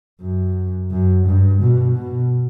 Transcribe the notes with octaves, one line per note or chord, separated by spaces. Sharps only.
F#2
F#2
G2
B2
B2